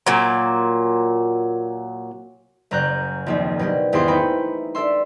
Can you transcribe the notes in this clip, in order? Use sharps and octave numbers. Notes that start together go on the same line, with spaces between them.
A#2 F#3
F#1 F#2 A#5 F#6 G6
A#1 D#2 C4
B2 F#3 D4 G4
G#1 E2 G4 C5 C6 D6
A3 D#4 G5 B5 C#7
D4 A4 E5 C6